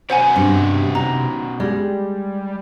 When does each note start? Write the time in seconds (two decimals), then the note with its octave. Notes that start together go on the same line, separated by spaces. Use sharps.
0.10 B3 C#4 F#4 C5 F#5 G#5
0.36 G2 C3
0.95 D#4 A#5
1.60 G3 G#3